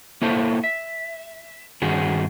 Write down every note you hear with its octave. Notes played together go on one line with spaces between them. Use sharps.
A#3 E4 A4 C5 C#5
E5
G2 D#3 C#4 F#4 G#4